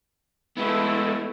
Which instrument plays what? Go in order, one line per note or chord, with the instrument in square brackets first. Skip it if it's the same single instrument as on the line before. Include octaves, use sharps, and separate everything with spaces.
[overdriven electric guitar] G#3 B3 [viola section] A3 E4